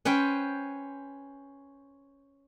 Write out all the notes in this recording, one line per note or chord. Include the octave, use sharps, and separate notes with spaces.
C#4 B4 C5 G5